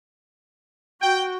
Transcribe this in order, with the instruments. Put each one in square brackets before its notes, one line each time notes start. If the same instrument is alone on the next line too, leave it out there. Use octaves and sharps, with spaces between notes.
[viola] F#4 [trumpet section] G5